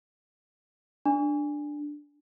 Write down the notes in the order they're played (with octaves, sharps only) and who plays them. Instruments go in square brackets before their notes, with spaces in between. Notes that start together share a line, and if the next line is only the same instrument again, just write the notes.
[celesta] D4